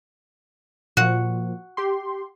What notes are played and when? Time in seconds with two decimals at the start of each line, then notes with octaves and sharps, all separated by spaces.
0.97 A#2 F3 F#4
1.77 G4 C6